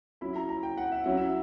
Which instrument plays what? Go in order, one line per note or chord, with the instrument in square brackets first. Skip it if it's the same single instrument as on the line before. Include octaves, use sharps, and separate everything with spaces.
[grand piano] F#3 C#4 E4 B5
A#5
A#5
G5
F#5
E5
F#3 C#4 E4 F#5
E5